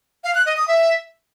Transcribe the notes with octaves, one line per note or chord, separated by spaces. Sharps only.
F5
F#6
D#5
D#6
E5